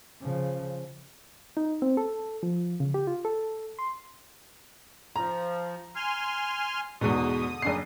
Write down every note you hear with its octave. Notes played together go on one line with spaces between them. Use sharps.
C#3 F3
D#4
C4
A4
F3
C#3
G4
F4
A4
C6
F3 A#5
G#5 C6 F6
E2 G#2 B2 D3 D#6
F#1 D4 C7